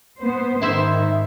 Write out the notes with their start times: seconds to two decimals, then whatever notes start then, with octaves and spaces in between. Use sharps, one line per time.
0.23 B3 C5
0.61 G#2 D#3 E4 C5 E5